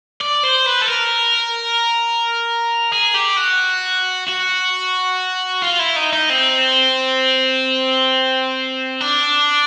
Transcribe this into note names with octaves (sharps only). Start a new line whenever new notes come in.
D5
C5
B4
A4
A#4
G#4
G4
F#4
F#4
F4
E4
D#4
D#4
C4
D4